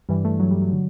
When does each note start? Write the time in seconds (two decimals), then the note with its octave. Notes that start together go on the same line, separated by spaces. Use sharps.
0.09 G2 E3 G3
0.25 A3
0.39 G2 E3 F#3
0.51 G3
0.62 F#3
0.72 D3